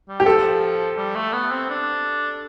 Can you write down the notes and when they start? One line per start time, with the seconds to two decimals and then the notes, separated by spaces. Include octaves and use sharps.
0.08 G3
0.20 G4
0.25 F3 A4
0.97 G3
1.15 A3
1.33 B3
1.51 C4
1.70 D4